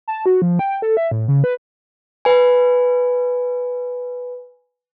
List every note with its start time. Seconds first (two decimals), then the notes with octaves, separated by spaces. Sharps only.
0.08 A5
0.26 F#4
0.42 F3
0.59 G5
0.82 A4
0.97 E5
1.12 A2
1.28 C#3
1.44 B4
2.25 B4 G#5